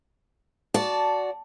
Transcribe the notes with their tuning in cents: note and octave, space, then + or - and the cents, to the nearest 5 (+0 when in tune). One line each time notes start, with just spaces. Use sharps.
F#4 +0 D5 -15 A5 +0